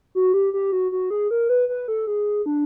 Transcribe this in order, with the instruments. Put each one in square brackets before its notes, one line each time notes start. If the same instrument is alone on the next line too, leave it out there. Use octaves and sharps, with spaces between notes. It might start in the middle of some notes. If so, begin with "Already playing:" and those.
[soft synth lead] F#4
G4
G4
F#4
F#4
G#4
A#4
B4
B4
A4
G#4
D4